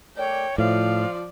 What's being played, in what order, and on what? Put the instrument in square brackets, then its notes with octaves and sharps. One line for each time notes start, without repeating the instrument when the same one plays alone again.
[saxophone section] A3 A#4 D5 [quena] C#5 [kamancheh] G5
[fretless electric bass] A2 [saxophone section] F3 [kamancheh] D5 [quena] F5